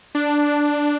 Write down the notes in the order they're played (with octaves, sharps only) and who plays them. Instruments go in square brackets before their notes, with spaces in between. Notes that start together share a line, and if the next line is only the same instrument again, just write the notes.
[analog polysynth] D4